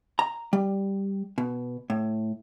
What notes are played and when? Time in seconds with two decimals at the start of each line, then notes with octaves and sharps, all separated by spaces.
0.19 A#5
0.53 G3
1.38 B2
1.90 A2